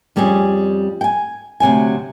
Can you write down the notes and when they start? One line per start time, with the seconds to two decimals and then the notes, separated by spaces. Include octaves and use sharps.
0.16 F2 G3 C4 C#4 G#4
1.01 G5 G#5
1.60 D2 C3 F#3 G#5